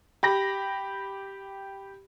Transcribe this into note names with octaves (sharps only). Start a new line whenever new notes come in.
G4 B5 A#6